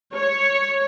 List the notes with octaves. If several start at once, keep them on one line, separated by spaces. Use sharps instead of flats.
C#5